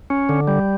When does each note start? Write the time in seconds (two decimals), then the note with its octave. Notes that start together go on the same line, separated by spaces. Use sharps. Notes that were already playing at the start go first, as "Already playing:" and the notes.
0.10 C#4
0.29 D3
0.48 G3